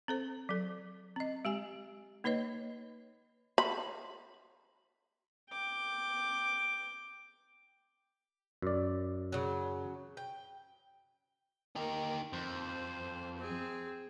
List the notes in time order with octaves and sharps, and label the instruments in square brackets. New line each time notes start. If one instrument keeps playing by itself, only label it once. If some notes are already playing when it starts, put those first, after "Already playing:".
[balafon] C4 A4 C5
F#3 A4
C4 D#5
G#3 G4 G#5
A#3 D#4 B4 C#5 D#5
[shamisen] B5
[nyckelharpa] G5 D6
[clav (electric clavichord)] F#2 D5
[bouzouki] C#3 F#3
G5
[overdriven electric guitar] D#4 G4 [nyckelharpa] A#4
[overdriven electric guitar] F2 [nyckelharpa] C5
[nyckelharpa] C4 G#4